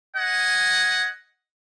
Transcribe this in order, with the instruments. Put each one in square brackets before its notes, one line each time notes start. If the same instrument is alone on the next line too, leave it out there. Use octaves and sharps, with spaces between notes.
[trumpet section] D#5 F#5 G#5